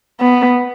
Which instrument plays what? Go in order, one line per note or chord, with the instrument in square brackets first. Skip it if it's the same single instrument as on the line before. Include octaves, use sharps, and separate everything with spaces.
[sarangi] B3